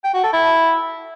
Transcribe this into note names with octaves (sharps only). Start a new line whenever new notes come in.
G5
F#4
A4
E4